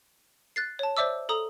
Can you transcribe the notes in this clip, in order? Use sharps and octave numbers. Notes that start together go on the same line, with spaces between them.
F#6 A6 C7
C#5 A5
C5 D5 E5 D6 E6
A4 A#5 D#6